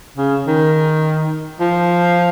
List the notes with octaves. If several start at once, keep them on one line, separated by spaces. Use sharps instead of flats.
C#3
D#3
F3